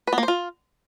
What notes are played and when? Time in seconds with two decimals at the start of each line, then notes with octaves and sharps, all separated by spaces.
0.07 B4
0.13 B3
0.18 A#3
0.23 C5
0.28 F4